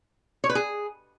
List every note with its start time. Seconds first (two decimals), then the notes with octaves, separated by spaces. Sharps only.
0.44 C#5
0.50 B4
0.55 G#4